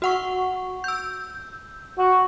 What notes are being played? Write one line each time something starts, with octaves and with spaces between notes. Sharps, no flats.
F#4 F#5 C#6
E6 G6
F#4